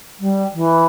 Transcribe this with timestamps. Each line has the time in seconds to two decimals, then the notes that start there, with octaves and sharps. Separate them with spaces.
0.19 G3
0.53 E3